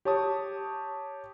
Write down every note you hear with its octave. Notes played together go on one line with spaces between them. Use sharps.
G4 C#5 A5 C#6 D#6